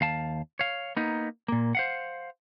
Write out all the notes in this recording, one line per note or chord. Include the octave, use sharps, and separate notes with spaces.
D#2 F5 A5
C#5 F5
A#3 B3 D#4
A#2 A#3
C5 F5 F#5